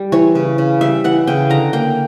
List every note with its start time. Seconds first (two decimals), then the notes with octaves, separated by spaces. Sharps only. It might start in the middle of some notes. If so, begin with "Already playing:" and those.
Already playing: G3
0.12 E3 C#5
0.35 C#3
0.58 C#3
0.81 G3 E5
1.04 E3 F#5
1.27 C#3 G5
1.50 D3 A#5
1.73 A#3 G5